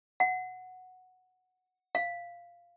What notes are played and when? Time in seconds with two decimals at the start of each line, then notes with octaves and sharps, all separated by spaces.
0.20 F#5
1.95 F5